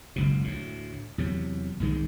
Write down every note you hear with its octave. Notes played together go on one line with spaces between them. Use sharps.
F#1 C#2 B2
D2 A2
E2 C3 F#3
C2 G#2 D#3 G#3